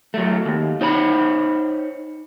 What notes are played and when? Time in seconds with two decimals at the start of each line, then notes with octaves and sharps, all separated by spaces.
0.14 F#3 A3
0.45 D#2
0.81 D#4 C5 C#5 A5 B5